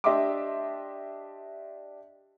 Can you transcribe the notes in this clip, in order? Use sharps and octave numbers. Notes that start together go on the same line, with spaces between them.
D4 G4 D#5 E5 C6 D6